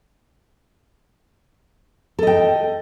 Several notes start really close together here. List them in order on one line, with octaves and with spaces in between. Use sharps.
A4 D#5 G5